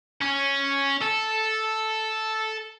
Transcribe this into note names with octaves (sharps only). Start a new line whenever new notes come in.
C#4
A4